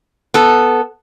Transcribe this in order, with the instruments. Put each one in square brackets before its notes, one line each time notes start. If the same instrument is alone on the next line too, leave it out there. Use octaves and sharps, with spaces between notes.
[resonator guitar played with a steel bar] B3 A4